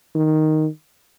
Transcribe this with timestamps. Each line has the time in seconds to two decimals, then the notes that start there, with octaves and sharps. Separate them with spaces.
0.15 D#3